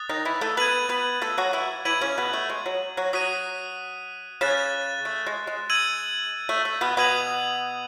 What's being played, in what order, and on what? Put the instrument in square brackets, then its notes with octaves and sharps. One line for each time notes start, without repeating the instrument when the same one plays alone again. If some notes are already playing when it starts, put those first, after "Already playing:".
Already playing: [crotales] D#6 F#6 A6
[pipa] D#3 D#4
E3 E4
A3 A4
[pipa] B3 B4 [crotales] G#6 D#7 F#7
[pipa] B3 B4
A3 A4
F#3 F#4
E3 E4
[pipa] E3 E4 [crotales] G#6 D#7 F#7
[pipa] C#3 C#4
B2 B3
A3
G#3
F#3
F#3 F#4
[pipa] F#3 F#4 [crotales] D#6 F#6 B6 D#7
[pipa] C#3 C#4 [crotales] F#6 A6 E7
[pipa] A3
G#3
G#3
[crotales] E6 G#6 D#7 F#7
[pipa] A3
A3
B2 B3
[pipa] B2 B3 [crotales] D#6 G#6 D#7 F#7